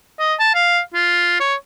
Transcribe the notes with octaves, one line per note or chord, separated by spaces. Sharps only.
D#5
A5
F5
F4
C#5